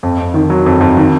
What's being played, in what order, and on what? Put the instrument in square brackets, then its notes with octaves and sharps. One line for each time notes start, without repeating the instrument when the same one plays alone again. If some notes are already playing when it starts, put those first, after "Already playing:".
[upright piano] F2
F2
D#3
F#3
F2
F2
D#3